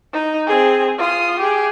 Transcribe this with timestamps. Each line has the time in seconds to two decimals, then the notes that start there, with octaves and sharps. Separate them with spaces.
0.13 D#4
0.47 C4 G#4
0.98 F4 D#6
1.40 G4 G#4